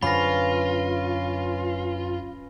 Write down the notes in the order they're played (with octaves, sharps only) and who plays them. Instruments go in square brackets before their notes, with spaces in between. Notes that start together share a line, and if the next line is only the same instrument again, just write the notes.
[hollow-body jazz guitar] F#2 D3 [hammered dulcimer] C#4 B4 [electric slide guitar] F4 [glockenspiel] B5 A#6